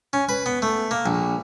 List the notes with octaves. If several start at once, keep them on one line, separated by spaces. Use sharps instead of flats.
C#4
B4
B3
A3
A#3
A#1